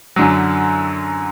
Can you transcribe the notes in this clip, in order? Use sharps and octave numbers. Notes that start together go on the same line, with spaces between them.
F#2 D3 F#3